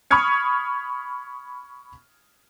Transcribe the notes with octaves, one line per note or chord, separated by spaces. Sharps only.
B5 C#6 D#6 F6 G#6 C#7